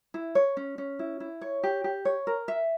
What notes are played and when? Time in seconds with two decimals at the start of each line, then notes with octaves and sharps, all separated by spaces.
0.14 E4
0.35 C#5
0.57 C#4
0.78 C#4
0.99 E4
1.20 E4
1.41 C#5
1.63 G4
1.84 G4
2.05 C#5
2.27 A#4
2.48 E5